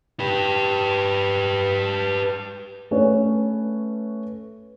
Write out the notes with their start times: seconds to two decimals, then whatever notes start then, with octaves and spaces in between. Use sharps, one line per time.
0.20 G4 B4
2.91 A3 C#4 B4 C#5